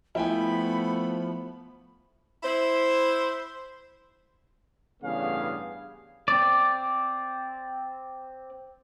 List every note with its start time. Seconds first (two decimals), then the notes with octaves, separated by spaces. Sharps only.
0.15 F3 A3 B3 E4 G5 G#5 B5
2.43 E4 C5
5.03 A1 G2 C#3 B3 G#4 F5
6.28 C4 D5